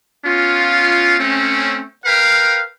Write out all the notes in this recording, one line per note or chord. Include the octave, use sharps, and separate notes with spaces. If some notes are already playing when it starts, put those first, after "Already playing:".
B3 C#4 F4
A3 C4 C#4
A#4 B4 F5 G5